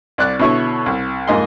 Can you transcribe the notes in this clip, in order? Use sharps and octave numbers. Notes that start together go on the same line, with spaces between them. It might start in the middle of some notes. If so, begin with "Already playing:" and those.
C2 D5 F#6
B2 D3 E4 C#5 C#6
C2
F2 G#2 A#3 D#5 G#5 C6